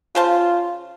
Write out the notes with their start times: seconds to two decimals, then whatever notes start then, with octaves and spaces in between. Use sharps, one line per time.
0.15 C#3 F4 C5 A5